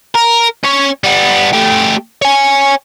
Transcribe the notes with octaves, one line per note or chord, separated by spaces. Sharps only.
A#4
C#4 C#5
G3 B3
A3 G4
C#5 G#5